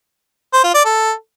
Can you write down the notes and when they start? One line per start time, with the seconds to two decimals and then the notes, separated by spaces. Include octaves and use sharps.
0.53 C5
0.64 F4
0.75 D5
0.85 A4